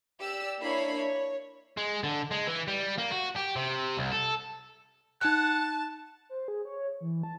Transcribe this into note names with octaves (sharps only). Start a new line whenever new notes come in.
G4 D5 E6
A#3 D4 E4 C#5 B5 C7
C#5
G#3
D3
G#3
E3
G3
A#3
F#4
G4
C3
C2
A4
D#4 F#5 A5 F#6
C5
G#4
C#5
E3
A5